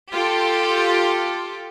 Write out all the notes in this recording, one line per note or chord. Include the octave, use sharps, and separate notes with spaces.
F4 G4 A4